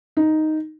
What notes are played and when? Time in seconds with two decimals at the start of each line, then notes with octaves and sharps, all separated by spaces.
0.17 D#4